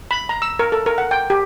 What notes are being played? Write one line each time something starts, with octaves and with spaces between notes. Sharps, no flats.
B5
A#5
E6
A#4
A4
A#4
F#5
G5
G4